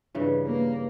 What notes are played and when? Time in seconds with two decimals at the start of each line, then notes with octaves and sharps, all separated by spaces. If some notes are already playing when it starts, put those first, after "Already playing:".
0.15 G2 C#3 E3
0.45 A#3